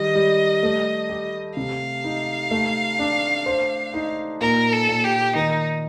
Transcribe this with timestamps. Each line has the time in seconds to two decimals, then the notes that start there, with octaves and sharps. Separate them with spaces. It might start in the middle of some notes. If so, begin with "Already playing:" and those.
Already playing: D#3 G3 D#5
0.15 G3
0.63 A3
1.10 G4
1.57 C3 F5
2.04 D#4
2.51 A3
2.99 D4
3.46 C5
3.94 D#4
4.41 A#2 A#4
4.72 A4
4.88 A#2
5.04 G4
5.35 D#3 D#4